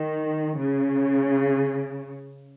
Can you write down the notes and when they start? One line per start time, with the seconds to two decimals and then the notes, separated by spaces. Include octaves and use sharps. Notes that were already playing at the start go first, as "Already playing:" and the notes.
Already playing: D#3
0.57 C#3